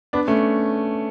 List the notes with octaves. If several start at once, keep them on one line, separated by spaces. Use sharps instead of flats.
B3 D4
A3 C#4